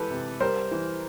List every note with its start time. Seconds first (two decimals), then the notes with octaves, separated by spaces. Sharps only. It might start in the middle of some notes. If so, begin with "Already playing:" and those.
Already playing: E3 G#3 G4 A4 B4
0.10 C3
0.40 G3 A#4 C5
0.71 E3